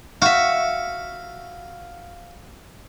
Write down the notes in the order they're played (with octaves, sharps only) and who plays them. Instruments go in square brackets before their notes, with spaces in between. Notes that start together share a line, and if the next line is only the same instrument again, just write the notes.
[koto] F#4 E5 [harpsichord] F5